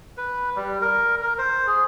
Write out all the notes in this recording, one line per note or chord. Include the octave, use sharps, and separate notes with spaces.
B4
G3
A#4
A#4
C5
G#4